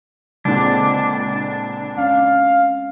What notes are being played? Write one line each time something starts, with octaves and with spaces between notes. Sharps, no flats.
C#2 A#2 D3 G#3 C4 D4
C#4 F5